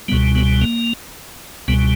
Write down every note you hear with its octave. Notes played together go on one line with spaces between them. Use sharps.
C#2 B2 G3 B3
B3
A#3
C#2 B2 G3 B3